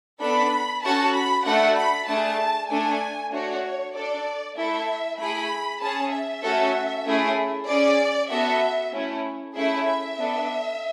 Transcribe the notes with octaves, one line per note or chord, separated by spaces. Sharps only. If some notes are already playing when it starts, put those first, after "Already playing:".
B3 D4 A4 B5
C#4 F#4 A4 A5
B5
A3 D4 F#4 A4 F#5
B5
A3 D4 G#4 A5
A3 D4 A4 G#5
A3 D4 F#4 C#5
D4 A4 D5
A3 E4 A4 E5
A3 E4 G#4 B5
C#4 G#4 A5
E5
A3 C#4 F#4 A4
A3 C#4 E4 G#4
C#4 G#4 D5
B3 F#4 A4 E5
A3 C#4 E4
A3 C#4 E4 G#4 E5
E5
B3 D4 A4